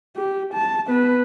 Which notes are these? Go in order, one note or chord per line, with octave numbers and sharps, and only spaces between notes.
G4
A5
B3 B4